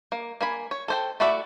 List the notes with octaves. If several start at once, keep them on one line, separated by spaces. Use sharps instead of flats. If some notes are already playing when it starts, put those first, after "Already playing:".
A#3
A#3 G#5 B5
C#5
A4 C5 G5
A3 E4 F#4 D5 E5